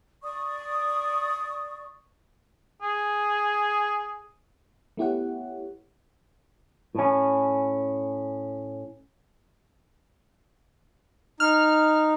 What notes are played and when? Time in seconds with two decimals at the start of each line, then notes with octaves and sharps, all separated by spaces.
0.22 D5 C#6 D#6
2.82 G#4
4.97 A3 B3 E4 G4 C#5 F#5
6.95 A2 C#4
11.40 D#4 F6